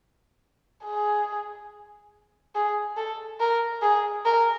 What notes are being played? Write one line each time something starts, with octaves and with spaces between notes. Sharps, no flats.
G#4
G#4
A4
A#4
G#4
A#4